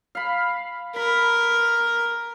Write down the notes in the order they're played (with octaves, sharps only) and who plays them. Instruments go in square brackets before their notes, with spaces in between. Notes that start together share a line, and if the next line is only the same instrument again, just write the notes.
[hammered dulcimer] F5 B5
[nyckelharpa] A#4 [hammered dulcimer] B5